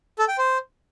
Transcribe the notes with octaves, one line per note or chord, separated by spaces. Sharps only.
A4
G5
C5